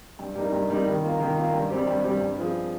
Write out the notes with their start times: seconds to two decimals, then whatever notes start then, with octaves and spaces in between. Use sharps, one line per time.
0.19 G2
0.35 G3 A#3 D#4
0.52 G2
0.70 G3 A#3 D#4
0.86 D#3
1.04 A#3 F4
1.20 D#3
1.37 A#3 F4
1.53 G2
1.70 G3 C4 G4
1.87 G2
2.04 G3 C4 G4
2.21 G2
2.38 F3 C4 F4 G#4